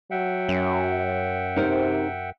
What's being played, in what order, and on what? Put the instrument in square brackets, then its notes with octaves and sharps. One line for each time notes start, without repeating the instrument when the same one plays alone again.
[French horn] F#3 [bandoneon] E5 F#5 G5
[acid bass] F#2
[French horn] C3 [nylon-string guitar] D#4 A#4 C5